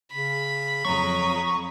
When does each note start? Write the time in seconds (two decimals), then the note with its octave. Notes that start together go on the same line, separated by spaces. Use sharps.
0.13 C#3 B5
0.85 F2 F#3 A#5 C#6 D#6